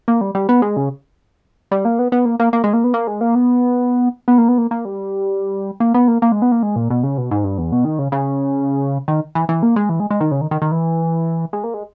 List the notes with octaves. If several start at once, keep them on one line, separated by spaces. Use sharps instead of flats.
A#3
G3
G3
B3
G#3
C#3
G3
A#3
B3
B3
A#3
A#3
A#3
G#3
A#3
B3
A#3
G#3
A#3
B3
B3
A#3
B3
A#3
A#3
G3
A#3
B3
A#3
A#3
G#3
B3
A#3
G#3
A#2
B2
C#3
B2
G#2
G2
E2
B2
D#3
C#3
C#3
D#3
E3
E3
A#3
G#3
E3
G#3
G#3
D#3
C#3
D#3
D#3
D#3
E3
G#3
A#3
G#3